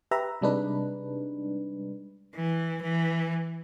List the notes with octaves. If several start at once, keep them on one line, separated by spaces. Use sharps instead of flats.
G4 B4 E5 A#5
C3 G3 G#3 D4 D#4 B4
E3
E3